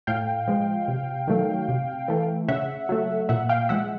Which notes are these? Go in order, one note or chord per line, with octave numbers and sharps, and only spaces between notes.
A2 F5 G5
F3 G#3
C3
D#3 F#3 A3
C3
E3 A3
C#3 E5 F#5
F#3 A3
A#2 E5 F#5
F5 G5
F3 G#3 E5 F#5